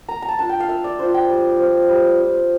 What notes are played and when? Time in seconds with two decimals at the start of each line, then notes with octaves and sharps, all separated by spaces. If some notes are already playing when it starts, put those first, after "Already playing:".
0.08 A#3 A#5
0.22 A#5
0.29 A5
0.39 D4 F4 A5
0.49 G5
0.60 F5
0.68 A#3 E5
0.84 D5
0.99 D4 F4 C5
1.14 G5
1.29 G3
1.59 C4 F4
1.89 G3
2.19 C4 F4